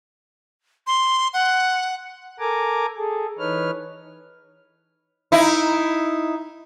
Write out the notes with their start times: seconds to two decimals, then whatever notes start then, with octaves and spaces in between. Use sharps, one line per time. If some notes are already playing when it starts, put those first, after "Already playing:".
0.87 C6
1.34 F#5
2.39 A4 A#4 G#5 A#5 D6
2.97 G#4 A4
3.39 E3 D#4 B4 C#5 F6
5.32 D#4 E4